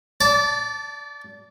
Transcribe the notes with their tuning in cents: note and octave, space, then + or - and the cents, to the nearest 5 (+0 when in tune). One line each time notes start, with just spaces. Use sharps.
D5 -25 A5 +0